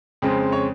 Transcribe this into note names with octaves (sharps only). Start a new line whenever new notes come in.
F2 C#3 G#3 C4
C#5